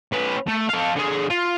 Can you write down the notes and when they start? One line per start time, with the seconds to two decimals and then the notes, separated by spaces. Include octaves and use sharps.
0.12 C#4 B4
0.47 A3
0.69 A4 F5
0.96 D3 G#4
1.30 F4